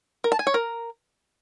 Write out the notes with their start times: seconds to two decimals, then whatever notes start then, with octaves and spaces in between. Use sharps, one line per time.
0.24 A#4
0.32 A5
0.39 G#5
0.47 C#5
0.54 A#4